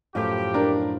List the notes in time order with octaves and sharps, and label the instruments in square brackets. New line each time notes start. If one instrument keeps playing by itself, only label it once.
[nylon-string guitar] F#2 A2 F3 [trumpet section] G4
[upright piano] D4 A#4